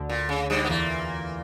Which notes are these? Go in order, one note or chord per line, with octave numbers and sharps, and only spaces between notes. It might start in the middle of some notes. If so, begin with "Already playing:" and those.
Already playing: D2 D3
A#2
C#3
G2 G3
B3
E2 A#2 E3 A#3